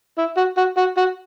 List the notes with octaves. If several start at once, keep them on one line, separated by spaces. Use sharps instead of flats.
E4
F#4
F#4
F#4
F#4